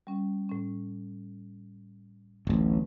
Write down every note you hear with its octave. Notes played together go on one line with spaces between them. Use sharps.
G3 C#4
A2 C#4
D1 A1